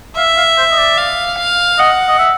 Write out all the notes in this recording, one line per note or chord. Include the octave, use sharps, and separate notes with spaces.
E5 F5
F5
C5
D#5
D5
F5
F5
D#5 F#5
D#5
E5